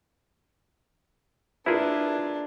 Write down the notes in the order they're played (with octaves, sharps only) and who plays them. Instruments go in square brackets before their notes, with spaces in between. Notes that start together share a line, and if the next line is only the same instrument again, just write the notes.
[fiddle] D4 [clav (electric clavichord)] E4 G#4 [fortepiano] F4 A#4 B4